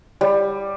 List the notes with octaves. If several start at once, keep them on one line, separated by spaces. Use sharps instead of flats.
G3